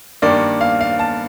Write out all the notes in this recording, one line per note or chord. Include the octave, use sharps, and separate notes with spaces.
G2 D#3 A#3 D5
F5
F5
A5